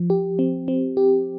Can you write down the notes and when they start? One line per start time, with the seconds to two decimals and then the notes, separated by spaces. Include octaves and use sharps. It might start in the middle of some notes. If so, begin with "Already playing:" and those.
Already playing: F3
0.10 G4
0.39 C4
0.68 C4
0.97 G4